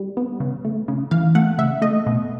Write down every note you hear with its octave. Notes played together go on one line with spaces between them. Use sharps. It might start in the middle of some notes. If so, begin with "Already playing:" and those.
Already playing: G3
B3
C#3
A3
C#3
E3 F5
A3 F#5
C#3 E5
A3 D#5
B2